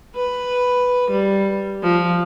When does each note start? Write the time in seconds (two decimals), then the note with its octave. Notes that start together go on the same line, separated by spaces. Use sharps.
0.16 B4
1.11 G3
1.83 F3